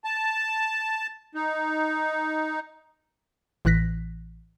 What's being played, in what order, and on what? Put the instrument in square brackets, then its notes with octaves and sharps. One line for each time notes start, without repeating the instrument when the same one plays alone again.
[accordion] A5
D#4
[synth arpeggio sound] A1 A2 E3 F#6 A#6 B6